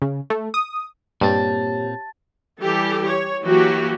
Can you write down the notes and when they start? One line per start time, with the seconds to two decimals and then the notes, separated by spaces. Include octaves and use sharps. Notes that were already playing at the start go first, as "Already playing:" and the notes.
0.02 C#3
0.30 A3
0.54 D#6
1.21 G2 A#2 A#3 C4 G4 C#5 A5 A6
2.60 E3 G3 G4 A4
3.07 C#5
3.43 E3 F#3 A#3 F#4 G4